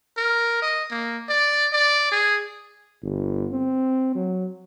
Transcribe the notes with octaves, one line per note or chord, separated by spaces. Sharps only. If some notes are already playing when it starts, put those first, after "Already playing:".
A#4
D#5
A#3
D5
D5
G#4
G1
C4
F#3